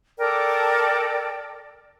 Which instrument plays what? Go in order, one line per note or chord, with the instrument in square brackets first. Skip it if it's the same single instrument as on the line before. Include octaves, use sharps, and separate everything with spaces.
[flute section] A4 A#4 D5 G5